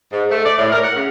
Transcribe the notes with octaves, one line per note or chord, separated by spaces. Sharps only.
G#2
A3
D5
A2
A#4
F#5
C#3